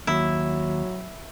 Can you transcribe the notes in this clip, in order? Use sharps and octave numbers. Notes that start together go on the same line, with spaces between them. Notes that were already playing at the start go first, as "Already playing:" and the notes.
D#2 F#3 E4